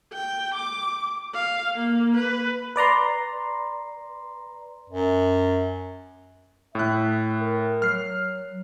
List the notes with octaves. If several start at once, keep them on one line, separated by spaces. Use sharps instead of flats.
G5
D6
F5
A#3
B4
B4 D5 A#5 C6
F#2
A2 E5 F#6
A#4
F#3 F6 C7